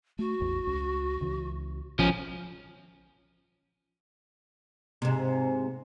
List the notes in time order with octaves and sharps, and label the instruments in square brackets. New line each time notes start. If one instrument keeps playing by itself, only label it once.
[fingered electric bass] A3 [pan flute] F#4
[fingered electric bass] A1 E2
C#2
C#2 C#3 E3
[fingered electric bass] A#1 [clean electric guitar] F3 C#4
[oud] G#2 C3